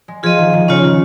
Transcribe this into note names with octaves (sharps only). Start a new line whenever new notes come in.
G#3
F3 F4 G#4 D#5
D#3
D#3
C#3 C#4 F4 C#5
D#3